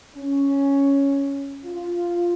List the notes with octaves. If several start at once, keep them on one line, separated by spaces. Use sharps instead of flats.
C#4
F4